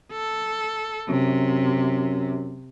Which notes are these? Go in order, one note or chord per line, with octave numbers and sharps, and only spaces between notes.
A4
F#2 C3